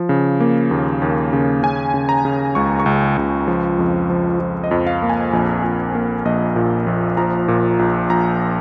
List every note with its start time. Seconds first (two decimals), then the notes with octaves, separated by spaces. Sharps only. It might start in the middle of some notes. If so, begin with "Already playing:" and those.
Already playing: F3
0.09 C#3
0.40 A#3
0.71 D#2
1.02 D#2
1.33 C#3
1.63 C#3 G#5
1.94 C#3
2.09 A#5
2.25 C#3
2.55 C#2 C#6
2.80 C#6
2.86 C#2
3.17 C#2
3.48 F3
3.79 F2
4.10 F3
4.40 F3
4.64 D#5
4.71 F2
4.87 F5
5.03 A#3
5.09 G#5
5.33 A#1
5.64 A#1
5.95 A#3
6.25 A#1 D#5
6.56 A#2
6.87 A#1
7.17 F3 A#5
7.48 A#2
7.79 A#1
8.10 A#1 A#5